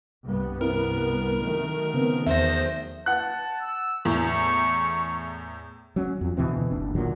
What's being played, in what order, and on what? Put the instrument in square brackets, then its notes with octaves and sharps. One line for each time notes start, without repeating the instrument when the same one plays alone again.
[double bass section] C2 G2 B3
[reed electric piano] C4 E4 [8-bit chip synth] A#4
[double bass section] D#3 F#3 A3
[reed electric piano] C#3 B3 C4
[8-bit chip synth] E2 C5 A#6 [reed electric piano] E5
[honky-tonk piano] F#5 F#6 [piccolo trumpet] A5
[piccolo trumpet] E6
[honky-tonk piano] E2 A2 [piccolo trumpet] C#6
[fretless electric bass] F#3 C#4
F2
D2 B2 E3 C4
F#1 D4
D2 A#2 D#3 F#3